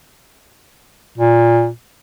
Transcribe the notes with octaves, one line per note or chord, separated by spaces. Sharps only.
A#2